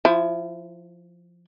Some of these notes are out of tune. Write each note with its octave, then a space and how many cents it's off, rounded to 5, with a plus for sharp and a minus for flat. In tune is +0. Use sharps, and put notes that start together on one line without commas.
F3 +0 E4 +25